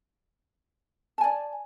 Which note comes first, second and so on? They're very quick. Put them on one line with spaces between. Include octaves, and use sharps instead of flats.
A5 G#5 D5